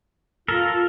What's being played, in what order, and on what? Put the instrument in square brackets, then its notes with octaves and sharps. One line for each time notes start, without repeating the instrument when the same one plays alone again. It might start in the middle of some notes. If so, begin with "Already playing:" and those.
[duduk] F4 [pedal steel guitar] A4 A#4